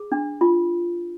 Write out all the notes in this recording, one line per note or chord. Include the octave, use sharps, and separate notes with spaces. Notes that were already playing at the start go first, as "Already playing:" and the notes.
Already playing: G#4
D4
F4